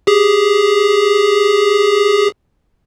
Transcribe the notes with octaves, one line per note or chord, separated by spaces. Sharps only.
G4 G#4